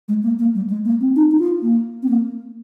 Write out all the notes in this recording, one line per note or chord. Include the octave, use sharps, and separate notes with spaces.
G#3
A#3
A#3
G3
G#3
A#3
C4
D#4
D#4
F4
A#3
C4
A#3